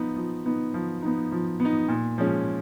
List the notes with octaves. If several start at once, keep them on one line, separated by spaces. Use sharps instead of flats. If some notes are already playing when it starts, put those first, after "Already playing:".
Already playing: F3 B3 D#4
F3
B3 D#4
F3
B3 D#4
F3
B3
D#4
A#2
F3 G#3 C#4